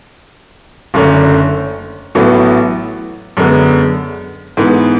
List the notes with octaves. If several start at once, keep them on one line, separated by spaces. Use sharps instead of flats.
F#1 F#2 D3 A3 C#4
A1 A2 F#3 B3
F#2 D3 G#3 B3
G#2 E3 B3